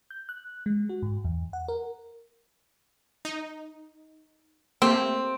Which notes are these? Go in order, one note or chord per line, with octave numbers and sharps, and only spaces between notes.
G6
F#6
G#3
F#4
G#2
E2
F#5
A#4
D#4
A3 A#3 C4 G4